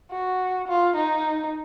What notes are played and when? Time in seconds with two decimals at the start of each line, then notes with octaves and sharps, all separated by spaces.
0.11 F#4
0.68 F4
0.96 D#4